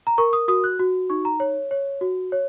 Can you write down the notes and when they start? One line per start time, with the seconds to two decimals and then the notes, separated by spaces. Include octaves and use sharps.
0.07 A#5
0.18 A#4 C#6
0.33 D#6
0.48 F#4 D#6
0.64 F#6
0.79 F#4
1.10 D#4 C#6
1.25 A#5
1.40 C#5
1.71 C#5
2.01 F#4
2.32 C#5